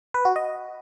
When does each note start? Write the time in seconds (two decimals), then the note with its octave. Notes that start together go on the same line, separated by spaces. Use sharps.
0.14 B4
0.25 F#4
0.36 D#5